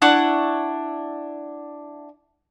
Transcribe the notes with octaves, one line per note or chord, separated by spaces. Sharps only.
D4 E4 F#5 C#6